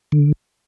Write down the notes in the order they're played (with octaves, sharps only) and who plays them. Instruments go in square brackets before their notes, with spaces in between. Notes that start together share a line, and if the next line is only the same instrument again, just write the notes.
[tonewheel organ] D3